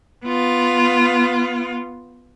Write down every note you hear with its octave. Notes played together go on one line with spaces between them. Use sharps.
B3 F4